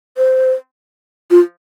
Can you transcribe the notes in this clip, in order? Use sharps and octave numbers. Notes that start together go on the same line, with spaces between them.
C5
F4